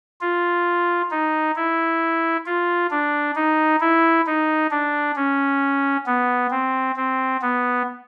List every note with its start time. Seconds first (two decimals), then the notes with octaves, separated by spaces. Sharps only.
0.21 F4
1.10 D#4
1.56 E4
2.46 F4
2.91 D4
3.35 D#4
3.81 E4
4.26 D#4
4.71 D4
5.16 C#4
6.06 B3
6.51 C4
6.96 C4
7.41 B3